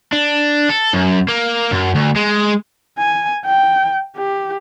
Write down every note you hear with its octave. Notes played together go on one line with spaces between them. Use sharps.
D4
A4
F#2
A#3
F#2
D2
G#3
G#5
G5
G4